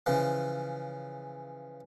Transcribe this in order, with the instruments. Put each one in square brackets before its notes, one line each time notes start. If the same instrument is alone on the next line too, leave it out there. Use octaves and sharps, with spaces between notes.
[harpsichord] C#3 E3 F3